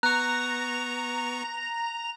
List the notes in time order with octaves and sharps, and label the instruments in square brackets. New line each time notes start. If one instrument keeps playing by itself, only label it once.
[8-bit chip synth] B3 C#6 [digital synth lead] A#5 [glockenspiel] F#6